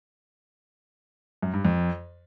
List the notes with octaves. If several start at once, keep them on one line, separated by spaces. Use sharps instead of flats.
F#2
G2
F2